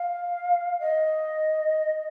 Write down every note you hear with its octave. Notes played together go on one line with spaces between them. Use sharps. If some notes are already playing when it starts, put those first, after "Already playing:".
Already playing: F5
D#5